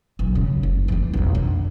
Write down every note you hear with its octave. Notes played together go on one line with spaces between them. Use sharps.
B1
C#3
F#1
E3 G3
B1 F2
D3